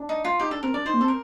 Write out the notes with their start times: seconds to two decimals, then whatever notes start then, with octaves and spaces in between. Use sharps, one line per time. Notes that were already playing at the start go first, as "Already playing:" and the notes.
Already playing: D4
0.09 D#4
0.24 F4
0.39 D#4 G4
0.51 D4 A4
0.63 C4 A#4
0.74 D4 D5
0.85 D#4 C5
0.94 A#3
1.01 C4 A4
1.08 A#4